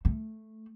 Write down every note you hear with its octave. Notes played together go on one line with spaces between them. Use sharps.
A3